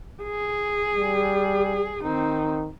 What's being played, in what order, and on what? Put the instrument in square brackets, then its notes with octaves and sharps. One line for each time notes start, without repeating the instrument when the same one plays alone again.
[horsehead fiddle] G#4
[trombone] G3
[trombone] D#3 [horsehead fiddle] C4 D#4